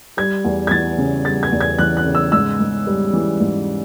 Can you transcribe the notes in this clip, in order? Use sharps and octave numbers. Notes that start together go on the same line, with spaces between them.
G3 G#6
E2
G#6
E3 A6
C#3
G3 A6
G#6
E2
G#6
E3 F#6
F#6
C#3
E6
G#2 E6
G#2
G3
E3
G#2